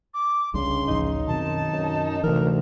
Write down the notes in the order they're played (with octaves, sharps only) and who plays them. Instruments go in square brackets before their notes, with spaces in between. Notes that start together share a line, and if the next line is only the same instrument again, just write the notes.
[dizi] D6
[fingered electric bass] C2 G3 D4 [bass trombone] C#3 [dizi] C6
[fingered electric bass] A1 D2 F3 [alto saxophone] D#4
[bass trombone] F#2 [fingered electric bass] B2 D#3 C4 [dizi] A5
[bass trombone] F#2
[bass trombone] D2 [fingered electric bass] C3 E3 [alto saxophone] A#4